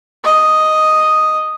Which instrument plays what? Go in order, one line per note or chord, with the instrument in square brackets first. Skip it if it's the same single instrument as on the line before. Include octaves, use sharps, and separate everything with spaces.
[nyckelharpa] D#5